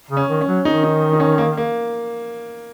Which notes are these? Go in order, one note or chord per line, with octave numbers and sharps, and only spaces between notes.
C#3
C#4
D#3
C#4
F#3
D#3 D#4
D#4
D#4
C#4
A#3
A#3